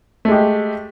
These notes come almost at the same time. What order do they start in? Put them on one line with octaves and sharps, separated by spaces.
A3 G#3 G4